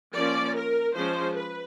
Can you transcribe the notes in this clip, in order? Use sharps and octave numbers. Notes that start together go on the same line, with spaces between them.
F3 A#3 C#4 D5
A#4
F3 G#3 C#4 C5
B4